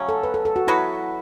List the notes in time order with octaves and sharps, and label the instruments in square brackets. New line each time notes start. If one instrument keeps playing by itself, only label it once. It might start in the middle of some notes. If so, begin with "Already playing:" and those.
Already playing: [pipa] C#3 F#3 A3 C#4
[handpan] A4
B4
A4
A4
F#4
[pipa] F#3 B3 F#4 B4 [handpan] E4